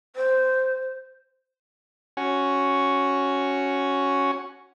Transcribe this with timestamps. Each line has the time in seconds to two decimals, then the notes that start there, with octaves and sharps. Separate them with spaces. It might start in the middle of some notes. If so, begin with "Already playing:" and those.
0.16 C5
2.17 C#4 F#4